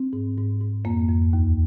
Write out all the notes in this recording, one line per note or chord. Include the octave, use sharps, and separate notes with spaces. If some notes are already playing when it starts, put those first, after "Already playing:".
Already playing: C4
G#2
G#2
G#2
F2 A#3
F2
D#2